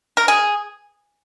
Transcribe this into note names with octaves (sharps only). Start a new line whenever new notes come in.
A#4
G#4